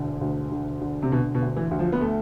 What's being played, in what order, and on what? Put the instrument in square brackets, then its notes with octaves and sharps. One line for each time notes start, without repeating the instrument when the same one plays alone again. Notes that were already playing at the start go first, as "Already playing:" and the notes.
Already playing: [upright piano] E1 D2 D3
D2
D3
D3
[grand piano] C3
[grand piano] B2 [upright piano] D3
[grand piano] B2
[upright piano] D2
[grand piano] E3
[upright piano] D2
[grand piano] F3
B3
A3